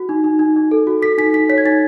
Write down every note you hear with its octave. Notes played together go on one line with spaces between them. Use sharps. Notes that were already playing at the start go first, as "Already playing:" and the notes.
Already playing: F#4
D#4
D#4
D#4
D#4
A4
F#4
A4 B6
D#4 B6
D#4 B6
C#5 B6
G#6
D#4 A6